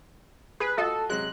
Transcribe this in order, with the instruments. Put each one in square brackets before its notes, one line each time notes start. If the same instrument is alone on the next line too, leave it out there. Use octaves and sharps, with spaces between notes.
[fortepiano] G#4 [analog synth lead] B4
[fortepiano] F4 F#4 D#5 [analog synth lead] A4
[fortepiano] C3 F#3 G#3 [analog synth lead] F#6